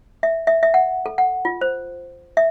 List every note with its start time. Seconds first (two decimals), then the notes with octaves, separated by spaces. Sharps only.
0.23 E5
0.47 E5
0.63 E5
0.74 F#5
1.06 A4
1.18 F#5
1.45 F4
1.61 C5
2.37 E5